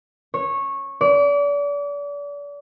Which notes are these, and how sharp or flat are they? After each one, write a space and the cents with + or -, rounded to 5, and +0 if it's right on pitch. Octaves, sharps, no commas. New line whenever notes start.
C#5 -15
D5 -35